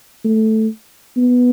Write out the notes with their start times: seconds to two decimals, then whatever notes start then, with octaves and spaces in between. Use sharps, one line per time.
0.25 A3
1.17 B3